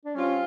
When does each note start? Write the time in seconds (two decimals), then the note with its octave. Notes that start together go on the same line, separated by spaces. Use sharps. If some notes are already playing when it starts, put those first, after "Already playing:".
0.05 D4
0.15 G3 C4 C#4 F4